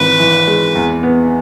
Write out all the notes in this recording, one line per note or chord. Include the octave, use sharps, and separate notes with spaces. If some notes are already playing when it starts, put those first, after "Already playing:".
Already playing: G#1 G#2 E3 B4
E3
G#3
E2
B3